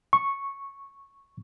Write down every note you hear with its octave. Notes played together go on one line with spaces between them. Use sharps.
C#6